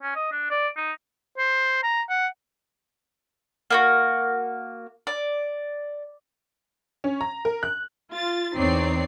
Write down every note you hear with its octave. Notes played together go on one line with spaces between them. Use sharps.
C#4
D#5
D4
D5
D#4
C5
A#5
F#5
A#3 E4 F#4
D5
C#4
A#5
A#4
F#6
F4 A6
E2 C4 D#4 C#5 D5 C7